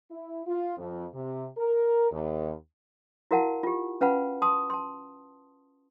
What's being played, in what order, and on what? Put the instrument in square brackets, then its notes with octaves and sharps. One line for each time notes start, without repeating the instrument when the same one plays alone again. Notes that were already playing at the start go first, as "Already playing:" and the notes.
[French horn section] E4
F4
F2
C3
A#4
D#2
[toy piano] E4 F#4 A#4 F5 F#5 A5
F4 G4
C#4 B4 F5 F#5 A5 B5
A5 C6 D#6 E6
A5 C6